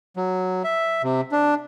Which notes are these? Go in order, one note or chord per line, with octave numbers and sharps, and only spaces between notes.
F#3
E5
C3
D4